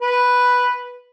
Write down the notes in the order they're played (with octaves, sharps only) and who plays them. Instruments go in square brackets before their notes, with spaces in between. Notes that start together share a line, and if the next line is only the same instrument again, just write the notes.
[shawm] B4